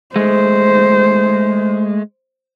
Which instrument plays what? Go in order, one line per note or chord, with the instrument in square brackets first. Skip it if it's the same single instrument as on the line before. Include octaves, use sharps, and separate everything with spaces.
[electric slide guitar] G#3 A3 [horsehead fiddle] C5